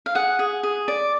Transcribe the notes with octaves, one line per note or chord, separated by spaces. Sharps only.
F5
G#4 F#5
G#4
G#4
D5